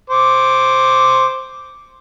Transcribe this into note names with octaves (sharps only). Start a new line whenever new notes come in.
C5 D6